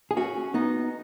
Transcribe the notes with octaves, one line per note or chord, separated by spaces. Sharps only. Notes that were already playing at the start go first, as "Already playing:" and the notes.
G#4
C#4 F#4
B3 D#4